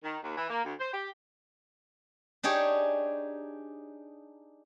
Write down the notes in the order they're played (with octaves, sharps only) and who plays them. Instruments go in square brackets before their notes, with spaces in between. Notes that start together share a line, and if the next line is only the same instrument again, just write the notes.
[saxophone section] D#3
D#2
E3
A#3
D2
C5
G4
[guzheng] D4 D#4 G4 G#4 C#5